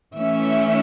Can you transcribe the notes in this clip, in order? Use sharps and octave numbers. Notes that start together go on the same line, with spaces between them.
E3 A3 C#4 E5